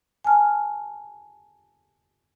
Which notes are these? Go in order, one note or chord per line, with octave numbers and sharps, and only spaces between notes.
G#5 A5 F6